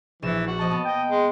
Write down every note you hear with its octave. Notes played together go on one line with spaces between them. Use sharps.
A#1 E3 E7
F#4
F3 D#5 A5
B3
D#5 G5
G#3